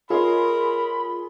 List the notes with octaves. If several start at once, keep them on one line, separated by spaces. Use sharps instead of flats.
F4 G#4 A#4 C#5 D#5 B5 C6